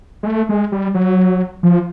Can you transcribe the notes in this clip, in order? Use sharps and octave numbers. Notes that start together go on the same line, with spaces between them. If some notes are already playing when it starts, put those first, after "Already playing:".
G#3
A3
G#3
G3
F#3
F3